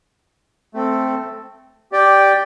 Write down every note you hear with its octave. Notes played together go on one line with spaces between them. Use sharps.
A3 C4 A4
G4 D5 G5